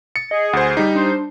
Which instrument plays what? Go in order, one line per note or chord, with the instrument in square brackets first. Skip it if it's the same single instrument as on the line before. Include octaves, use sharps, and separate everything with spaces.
[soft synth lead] A6 [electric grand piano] C#7
[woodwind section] G#4 [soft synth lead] D#5
[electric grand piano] D2 C5 [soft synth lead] F#5
[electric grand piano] G3 D#4 [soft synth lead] B6
[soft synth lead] D4 [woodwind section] C5